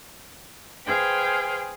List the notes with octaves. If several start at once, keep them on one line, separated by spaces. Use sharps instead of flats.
G#4 B4 C5 F5 G5 G#5